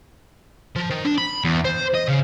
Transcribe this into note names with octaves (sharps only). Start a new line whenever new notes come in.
F3
D#3
D4
B5
E2
C5
D#5
C#3